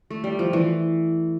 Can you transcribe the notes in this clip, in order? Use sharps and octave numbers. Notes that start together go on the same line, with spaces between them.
A3
G3
F3
E3